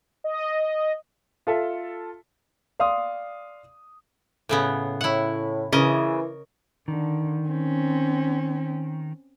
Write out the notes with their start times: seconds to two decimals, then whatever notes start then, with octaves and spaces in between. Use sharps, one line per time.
0.24 D#5
1.47 F4 A4 E5
2.79 D5 F5 C6 D#6
4.49 A2 C#3 B3
5.01 A2 E4 F#5
5.72 C#3 E3 A#4 D#5
6.88 D3 D#3
7.48 C4 C#4